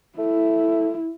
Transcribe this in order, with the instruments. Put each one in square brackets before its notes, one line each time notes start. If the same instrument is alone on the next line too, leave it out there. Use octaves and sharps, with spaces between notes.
[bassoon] A3 [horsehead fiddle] E4